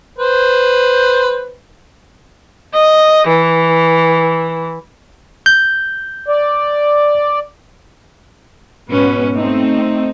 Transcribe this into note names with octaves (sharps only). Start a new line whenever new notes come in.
B4 C5
D#5
E3
G6
D5
G#2 B2 C#4 B4
A3 C4 D#4